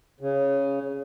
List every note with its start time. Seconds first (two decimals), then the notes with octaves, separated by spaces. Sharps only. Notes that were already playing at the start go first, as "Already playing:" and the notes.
0.20 C#3